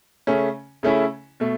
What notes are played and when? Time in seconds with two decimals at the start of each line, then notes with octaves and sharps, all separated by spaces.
0.27 C#3 A3 C#4
0.83 C#3 A3 C#4 E4
1.40 B2 A3